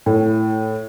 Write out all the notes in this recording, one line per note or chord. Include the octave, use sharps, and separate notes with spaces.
A2